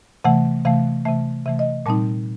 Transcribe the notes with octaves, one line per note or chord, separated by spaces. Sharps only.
C3 E3 A3 F#5
C3 E3 A3 F5
C3 E3 A3 E5
C3 E3 A3 E5
D#5
A#2 G3 C4 D#4 A5